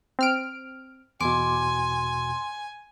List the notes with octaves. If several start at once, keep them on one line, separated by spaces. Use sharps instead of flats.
C4 F6 D7
E2 B2 G#5 C6 D6